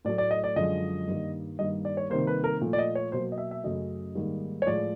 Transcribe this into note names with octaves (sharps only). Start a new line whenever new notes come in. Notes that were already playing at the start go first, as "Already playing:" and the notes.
A2 F#3 A3 D5
D5
D#5
D5
F#2 D3 F3 G#3 D#5
G2 D#3 G3 A#3
G2 D#3 G3 A#3 D#5
D5
C#5
C3 D#3 G3 A#3 C5
B4
A#4
A#2 F3 A3
D5
D#5
C#5
B2 F#3 A#3 C5
D#5
E5
E5
F#2 C#3 F#3 A3 D#5
G#2 D#3 G3 A#3
C#5
A2 F3 G#3 D5